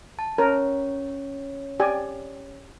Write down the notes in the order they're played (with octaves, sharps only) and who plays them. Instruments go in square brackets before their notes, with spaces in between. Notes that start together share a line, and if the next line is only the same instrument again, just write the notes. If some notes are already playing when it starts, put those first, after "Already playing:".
[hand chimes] A5
[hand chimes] C#4 C#5 [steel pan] A#4
[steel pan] G4 D5 G#5